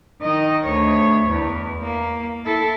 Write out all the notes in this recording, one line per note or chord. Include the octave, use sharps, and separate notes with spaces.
D#3 D#5
D2 C#5
E2
A#3
E4 A4